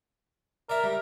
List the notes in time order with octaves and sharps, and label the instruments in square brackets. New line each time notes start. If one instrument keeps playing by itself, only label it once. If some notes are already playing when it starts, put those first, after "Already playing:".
[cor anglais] A#4 [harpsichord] D5 E5
[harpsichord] G3